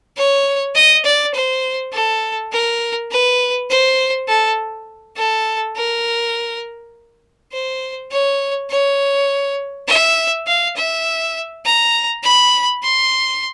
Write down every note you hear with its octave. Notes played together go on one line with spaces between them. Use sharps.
C#5
D#5
D5
C5
A4
A#4
B4
C5
A4
A4
A#4
C5
C#5
C#5
E5
F5
E5
A#5
B5
C6